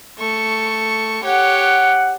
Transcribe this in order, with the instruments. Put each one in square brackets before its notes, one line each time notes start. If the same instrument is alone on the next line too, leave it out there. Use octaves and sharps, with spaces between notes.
[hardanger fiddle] A3 C#6
[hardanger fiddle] G4 C#5 [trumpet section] F#5